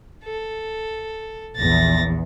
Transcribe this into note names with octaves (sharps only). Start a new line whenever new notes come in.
A4
A#1 E2 A6 A#6